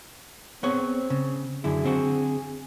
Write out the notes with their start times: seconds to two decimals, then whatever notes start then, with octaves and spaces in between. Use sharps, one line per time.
0.63 B3 C4 G#4 C#5
1.10 C#3
1.64 F#2 D3 E4 G#4
1.84 D3 C4 F#4